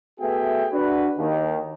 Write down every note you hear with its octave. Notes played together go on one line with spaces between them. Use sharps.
A3 B3 F#4 G#4 E5 G5
D4 F#4 B4
D#2 D#3